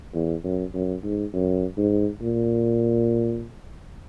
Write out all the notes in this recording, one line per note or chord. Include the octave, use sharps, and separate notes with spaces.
E2
F#2
F#2
G#2
F#2
G#2
A#2